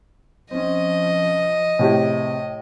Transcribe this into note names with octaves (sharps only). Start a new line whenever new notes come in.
F3 C4 C#4 D#5
A2 C3 G4 G#4